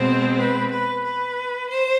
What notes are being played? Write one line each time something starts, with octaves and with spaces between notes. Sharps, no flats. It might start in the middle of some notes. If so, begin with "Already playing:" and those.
Already playing: B2 G#3 C4 C5
B4
B4
B4
C5